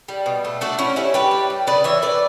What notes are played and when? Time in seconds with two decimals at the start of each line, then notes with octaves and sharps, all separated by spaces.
0.08 G3
0.26 B2
0.45 A3
0.61 A3 D4 F#4
0.79 A3 C#4 E4
0.96 G3 C#4 E4
1.14 G3 G4 B4
1.31 G3
1.50 G3
1.67 C#3 B4 D5
1.84 E3 C#5 E5
2.02 E3 B4 D5